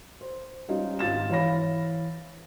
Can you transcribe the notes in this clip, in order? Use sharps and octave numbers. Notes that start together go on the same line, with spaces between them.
C5
G3 C#4 D#4 F4
G#1 F4 A6 E7
E3 C#5 F5 B5 A#6